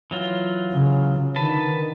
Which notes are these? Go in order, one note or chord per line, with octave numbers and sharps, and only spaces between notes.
E3 F#3 F4
C#3
D3 D#3 B4 A5